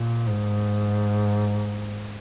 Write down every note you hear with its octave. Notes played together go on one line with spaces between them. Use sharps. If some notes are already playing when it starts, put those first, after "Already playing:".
Already playing: A#2
G#2